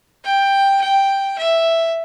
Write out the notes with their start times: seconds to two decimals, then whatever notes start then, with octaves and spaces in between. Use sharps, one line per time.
0.24 G5
0.81 G5
1.38 E5